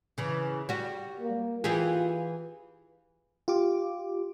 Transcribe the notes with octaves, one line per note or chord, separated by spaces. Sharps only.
C#3 E3
G3 F#4
A#3
E3 F4 G4 G#4
F4 G4 D6